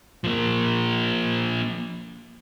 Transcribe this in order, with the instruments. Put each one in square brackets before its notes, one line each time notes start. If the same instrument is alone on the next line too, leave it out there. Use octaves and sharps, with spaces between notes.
[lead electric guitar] F3 A#3